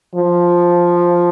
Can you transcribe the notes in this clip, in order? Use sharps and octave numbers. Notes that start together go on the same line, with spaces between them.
F3